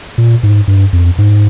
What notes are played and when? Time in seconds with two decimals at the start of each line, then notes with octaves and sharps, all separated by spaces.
0.18 A#2
0.43 G#2
0.68 G2
0.93 F2
1.18 G#2